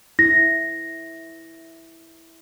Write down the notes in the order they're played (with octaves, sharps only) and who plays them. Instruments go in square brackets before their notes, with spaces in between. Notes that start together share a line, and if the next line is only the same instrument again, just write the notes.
[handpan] E4 [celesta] A#6